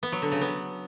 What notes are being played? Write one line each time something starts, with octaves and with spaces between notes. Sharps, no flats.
B3
F#3
D3
C#3
B3